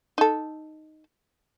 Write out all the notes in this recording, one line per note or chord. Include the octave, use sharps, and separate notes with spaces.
D#4 A4